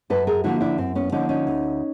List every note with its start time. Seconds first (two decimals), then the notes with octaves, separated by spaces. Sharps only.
0.10 F#2 A4 B4
0.27 G#4 A#4
0.44 D3 F3 A#3 E4 F#4
0.61 D4 E4
0.78 F#2 C4
0.95 B3 C#4
1.12 D3 F3 A#3 C#4 D#4
1.29 C#4 D#4
1.47 D2